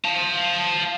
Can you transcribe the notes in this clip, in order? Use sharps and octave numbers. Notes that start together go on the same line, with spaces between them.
F5 A5